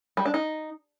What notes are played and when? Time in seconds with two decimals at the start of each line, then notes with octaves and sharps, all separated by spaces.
0.17 G3
0.25 D4
0.34 D#4